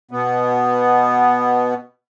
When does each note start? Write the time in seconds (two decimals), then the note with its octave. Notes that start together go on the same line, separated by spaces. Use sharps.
0.11 B2 B3